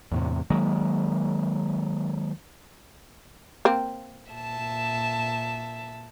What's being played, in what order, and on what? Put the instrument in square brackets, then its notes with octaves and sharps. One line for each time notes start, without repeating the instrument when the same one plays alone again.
[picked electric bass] E2 A2 C3
D#3 F#3 G#3 A#3
[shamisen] A#3 C4
[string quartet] A#2 E5 A5